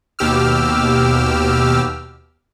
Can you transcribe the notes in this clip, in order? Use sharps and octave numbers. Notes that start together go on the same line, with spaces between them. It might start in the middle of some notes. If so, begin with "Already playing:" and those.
D#2 B2 G4 D6 E6 F6